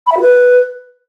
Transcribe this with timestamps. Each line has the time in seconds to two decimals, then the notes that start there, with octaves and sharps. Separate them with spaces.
0.06 B5
0.11 E5
0.17 F#4
0.22 B4